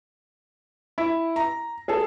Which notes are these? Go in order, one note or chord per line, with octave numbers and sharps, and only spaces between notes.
E4
A#5
G#4 A4